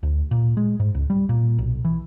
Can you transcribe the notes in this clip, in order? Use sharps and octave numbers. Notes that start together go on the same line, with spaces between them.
D2
A#2
G#3
G#2
C#2
G3
A#2
B1
E3